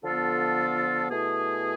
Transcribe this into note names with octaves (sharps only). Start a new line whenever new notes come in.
D3 F3 B3 F4 A4
B2 A3 E4 G#4